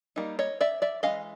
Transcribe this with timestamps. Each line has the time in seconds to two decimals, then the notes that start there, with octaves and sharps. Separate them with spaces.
0.16 G3 A#3 D#4
0.39 C#5 D#5
0.61 D5 E5
0.82 D5 E5
1.03 E3 G#3 C#4 D#5 F5